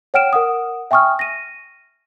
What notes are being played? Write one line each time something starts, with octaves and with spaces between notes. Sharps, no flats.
C#5 F#5 G5 F6 D7 E7
A#4 F#5 D#6
E5 G5 G#5 C#6 D#6 F6
A#6 D#7